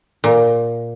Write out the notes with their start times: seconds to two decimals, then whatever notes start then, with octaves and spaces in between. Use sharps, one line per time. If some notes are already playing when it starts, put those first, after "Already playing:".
0.24 A#2